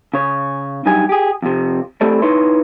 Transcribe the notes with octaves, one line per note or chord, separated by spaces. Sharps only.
C#3 C#5
G2 F#3 D#4 G4 G#5
G4 G#4
F2 C3
A3 C4 E4 G4 A4 D5
D#4 E4 B4 C#5 C6